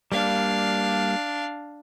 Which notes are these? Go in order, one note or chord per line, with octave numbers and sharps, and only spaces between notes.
G3 A#3 D4 F5